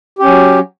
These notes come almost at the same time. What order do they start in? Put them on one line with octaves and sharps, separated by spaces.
G4 C#4 F#3